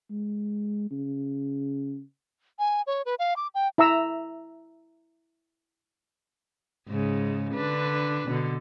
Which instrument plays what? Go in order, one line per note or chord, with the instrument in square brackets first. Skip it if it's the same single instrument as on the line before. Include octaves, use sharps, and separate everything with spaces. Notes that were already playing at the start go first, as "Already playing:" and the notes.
[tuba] G#3
C#3
[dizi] G#5
C#5
B4
F5
D6
G5
[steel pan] E4 E5 A#5 E6
[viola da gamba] G#2 C#3
D3 D4 B4
B2 D3